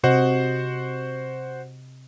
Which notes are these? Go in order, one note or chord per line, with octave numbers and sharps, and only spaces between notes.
C3 F#4 C5 D#5 F#5